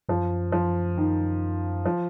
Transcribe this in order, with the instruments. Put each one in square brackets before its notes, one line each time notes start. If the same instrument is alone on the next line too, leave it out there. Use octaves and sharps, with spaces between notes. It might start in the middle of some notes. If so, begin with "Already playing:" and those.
[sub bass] F#2 [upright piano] F3
[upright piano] F3
D#3
F3